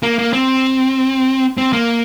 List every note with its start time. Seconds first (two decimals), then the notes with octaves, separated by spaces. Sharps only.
0.03 A#3
0.19 A#3
0.33 C4
1.57 C4
1.73 A#3